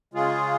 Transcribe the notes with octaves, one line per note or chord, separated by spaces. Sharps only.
C#3 G#3 F4 G#4